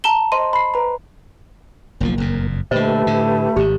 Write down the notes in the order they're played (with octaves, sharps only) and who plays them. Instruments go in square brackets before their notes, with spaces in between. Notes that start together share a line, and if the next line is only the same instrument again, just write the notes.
[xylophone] A5 A#5 E7 G7
C5 D#5 C6 D#7
B5 C7
B4 A#5
[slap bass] F#1 B1 F3 [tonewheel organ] A#3
[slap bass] F#1 F2 A#2
[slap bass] A#2 D3 [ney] A3 [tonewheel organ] G4 B4 [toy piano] C5 D#5
[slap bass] A2 D3
[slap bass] G#1 G#2 [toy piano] G4